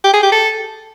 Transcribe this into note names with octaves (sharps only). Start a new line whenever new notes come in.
G4
G#4
G4
A4